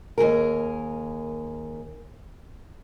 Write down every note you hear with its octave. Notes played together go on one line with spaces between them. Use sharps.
D#2 C3 G#4 A#4